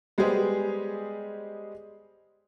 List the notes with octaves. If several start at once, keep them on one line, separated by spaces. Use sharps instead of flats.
G3 G#3 B3 G4 G#4 C5